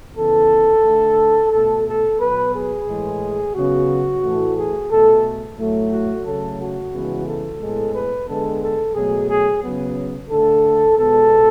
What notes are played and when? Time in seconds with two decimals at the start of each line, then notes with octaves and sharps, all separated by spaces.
0.17 C#3 E3 B3 A4
0.84 D3 A3
1.51 B2 A3 A4
1.86 A4
2.20 B2 F#3 B3 B4
2.53 G#4
2.88 A2 E3 G#3
3.54 C#3 F#3 B3 F#4
4.22 A2 E3 A3
4.56 G#4
4.90 B2 A3 A4
5.57 A2 F#3 A3
5.91 F#4
6.25 C#3 F#3 A3 A4
6.59 F#4
6.93 C#3 E3 G#3 B3
7.26 A4
7.60 A2 G#3 B3
7.94 B4
8.27 D3 G#3 B3 A4
8.62 A4
8.95 B2 F#3 A3 G#4
9.29 G#4
9.62 C#3 F#3 B3
10.30 D3 A3 A4
10.98 B2 G#3 B3 A4